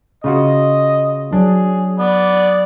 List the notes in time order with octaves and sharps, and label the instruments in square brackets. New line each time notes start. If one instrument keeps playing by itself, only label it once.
[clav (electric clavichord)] C#3 F4 F#4 [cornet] D#5
[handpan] F#3 [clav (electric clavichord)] D4 [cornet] G#4
[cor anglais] B3 [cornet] D5